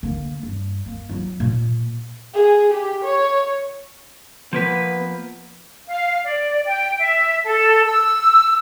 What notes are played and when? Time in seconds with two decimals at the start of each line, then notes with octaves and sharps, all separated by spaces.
0.03 D3 A#3
0.43 G2
0.86 A#3
1.09 F#3 F4
1.40 A#2
2.34 G#4
2.73 G4
3.04 C#5
4.53 F3 A#3 B3 B4
5.87 F5
6.25 D5
6.64 G5
6.98 E5
7.43 A4
7.85 E6